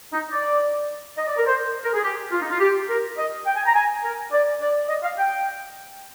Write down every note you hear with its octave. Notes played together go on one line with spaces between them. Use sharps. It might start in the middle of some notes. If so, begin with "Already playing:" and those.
D#4
D5
D#5
D5
A#4
C5
A#4
G#4
G4
F4
D#4
F4
G4
A#4
D#5
G5
G#5
A#5
G#5
A#4
D5
D5
D#5
F5
G5